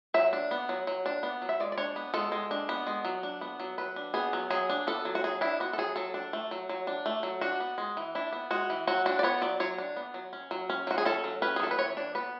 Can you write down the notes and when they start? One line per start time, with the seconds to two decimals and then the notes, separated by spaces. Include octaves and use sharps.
0.14 F#3 E5
0.33 D4
0.51 B3
0.69 F#3
0.87 F#3
1.06 D4
1.23 B3
1.42 F#3
1.49 E5
1.60 G#3 D5
1.72 D5
1.78 D4 C#5
1.96 B3
2.14 G#3 A4
2.32 G#3
2.51 D4
2.69 B3
2.87 G#3
3.05 F#3
3.23 D4
3.41 B3
3.60 F#3
3.78 F#3 B4
3.96 D4
4.14 B3 G#4
4.33 F#3
4.50 F#3 G#4
4.70 D4
4.87 B3 A4
5.05 F#3
5.15 F#4
5.24 F#3 G#4
5.41 D4 E4
5.60 B3 F#4
5.73 A4
5.78 F#3 G#4
5.96 F#3 A4
6.14 D4
6.33 A3
6.51 F#3
6.69 F#3
6.87 D4
7.06 A3
7.23 F#3
7.41 D4 F#4
7.60 B3
7.78 G#3
7.97 E3
8.15 D4 E4
8.33 B3
8.51 G#3 F#4
8.70 E3
8.87 F#3 F#4
9.06 D4 F#4
9.19 D5
9.23 B3 C#5
9.42 F#3 D5
9.60 F#3 C#5
9.78 D4
9.96 B3
10.14 F#3
10.33 C#4
10.51 F#3
10.70 C#4
10.87 F#3 F#4
10.98 G#4
11.05 C#4 A4
11.24 F#3
11.42 C#4 B4
11.56 G#4
11.60 F#3 A4
11.71 B4
11.78 E3 C#5
11.97 D4
12.15 B3 B4